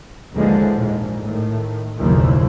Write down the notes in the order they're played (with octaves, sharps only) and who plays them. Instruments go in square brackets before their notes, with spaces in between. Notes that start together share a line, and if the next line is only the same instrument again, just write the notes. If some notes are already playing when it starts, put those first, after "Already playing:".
[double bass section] A#1 D#2 D3 E3 F3 G#3
A#1 G#2
A2 D#3
F#1 D#2 B2 E3 F3